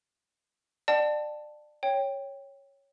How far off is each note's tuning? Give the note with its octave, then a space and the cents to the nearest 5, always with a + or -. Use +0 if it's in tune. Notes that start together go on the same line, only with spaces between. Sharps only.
D5 +30 F#5 +45 A5 +0
C#5 -5 G5 +10